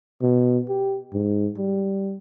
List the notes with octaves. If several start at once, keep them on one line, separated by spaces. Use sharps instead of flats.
B2
G4
G#2
G3